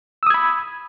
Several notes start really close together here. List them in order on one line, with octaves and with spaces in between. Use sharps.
E6 D#6 G#6 B5